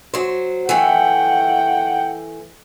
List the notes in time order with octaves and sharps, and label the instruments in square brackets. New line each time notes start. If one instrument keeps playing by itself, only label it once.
[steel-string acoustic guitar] F#3 C5
[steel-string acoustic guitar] E3 A3 [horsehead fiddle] F#5 G5